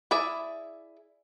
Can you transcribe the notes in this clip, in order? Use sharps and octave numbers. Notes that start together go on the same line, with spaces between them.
E4 G#4 D5 E5